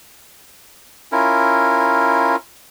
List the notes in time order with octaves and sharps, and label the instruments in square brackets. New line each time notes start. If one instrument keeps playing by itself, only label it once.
[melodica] C#4 E4 F4 A#4